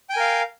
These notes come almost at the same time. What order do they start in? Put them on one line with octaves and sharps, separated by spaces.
G5 G#5 A#4 F5